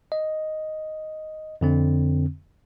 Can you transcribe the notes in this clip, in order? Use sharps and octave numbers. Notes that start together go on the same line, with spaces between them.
D#5
F2 D3 C4